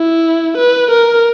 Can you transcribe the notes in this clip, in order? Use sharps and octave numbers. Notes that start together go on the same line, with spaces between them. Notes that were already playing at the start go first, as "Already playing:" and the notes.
Already playing: E4
B4
A#4